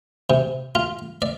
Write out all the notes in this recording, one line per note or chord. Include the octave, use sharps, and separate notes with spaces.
C3
F4
D5